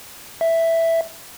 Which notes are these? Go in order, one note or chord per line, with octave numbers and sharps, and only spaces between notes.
E5